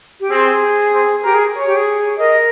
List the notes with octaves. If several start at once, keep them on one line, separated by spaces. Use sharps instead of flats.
G4
C4 G#4
C4
G4 A#4
G#4
C#5
G4
G#4
A#4 D#5